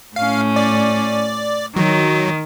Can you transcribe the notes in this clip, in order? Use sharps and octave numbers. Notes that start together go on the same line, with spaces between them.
A2 C#4 F5
D5
D#3 F#3